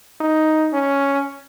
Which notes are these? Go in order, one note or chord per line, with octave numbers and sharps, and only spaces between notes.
D#4
C#4